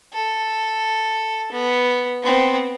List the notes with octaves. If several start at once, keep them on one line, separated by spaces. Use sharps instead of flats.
A4
B3
B3 C4